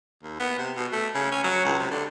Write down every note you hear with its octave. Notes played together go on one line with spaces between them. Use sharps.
D#2
B3
C3
B2
A3
C#3
C#4
F#3
C#2
C3
D3